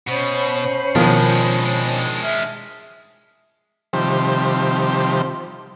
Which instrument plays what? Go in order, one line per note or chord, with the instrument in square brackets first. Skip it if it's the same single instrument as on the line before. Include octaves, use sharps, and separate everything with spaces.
[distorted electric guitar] B2 [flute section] C#4 C5 B5
[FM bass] B2 [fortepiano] D#3 F3 [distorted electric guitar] G#3 D4
[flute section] E5 F6
[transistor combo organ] C3 D#3 F3 G3 G4 C5